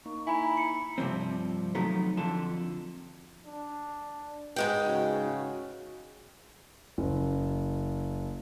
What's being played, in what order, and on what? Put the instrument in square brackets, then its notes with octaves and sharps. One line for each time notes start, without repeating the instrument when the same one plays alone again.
[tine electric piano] A#3 D#4 [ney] C#6
[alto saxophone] E4 [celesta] G#5 B5 [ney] A#5
[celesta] C#7
[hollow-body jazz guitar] G2 C3 E3 F3 C4
D#3 F3 F#3 A3 B3
F2 D3 F4 A5
[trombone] D4
[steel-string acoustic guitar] G#2 G#3 G5 [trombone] F#4 [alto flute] B4
[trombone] C#3 [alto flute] F#4
[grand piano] F#1